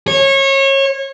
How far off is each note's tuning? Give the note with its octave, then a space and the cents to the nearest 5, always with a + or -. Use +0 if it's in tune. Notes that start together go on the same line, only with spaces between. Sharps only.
C#5 -25